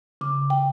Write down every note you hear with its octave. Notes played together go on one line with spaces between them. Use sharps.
C#3 D6
G5